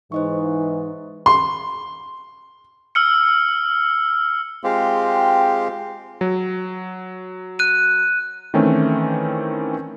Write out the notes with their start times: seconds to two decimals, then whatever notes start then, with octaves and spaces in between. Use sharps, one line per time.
0.12 G#2 E3 D#4 C5 D#5 C#6
1.26 C6
2.95 E6 F6 C#7
4.64 G#3 C4 F4 G4
6.21 F#3
7.59 F#6 D#7
8.54 D#3 E3 A3 C4 C#4